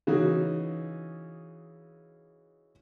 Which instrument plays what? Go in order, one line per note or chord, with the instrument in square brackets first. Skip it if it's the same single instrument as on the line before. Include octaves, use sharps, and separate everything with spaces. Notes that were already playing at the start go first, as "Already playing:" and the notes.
[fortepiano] C#3 E3 D#4 F#4